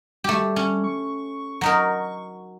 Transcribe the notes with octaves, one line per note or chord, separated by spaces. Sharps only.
G3 A3 G4
C#4
C#6
F#3 D#4 A#4